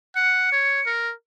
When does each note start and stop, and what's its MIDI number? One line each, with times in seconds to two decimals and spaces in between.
0.16 0.49 78
0.16 0.90 97
0.52 0.81 73
0.86 1.13 70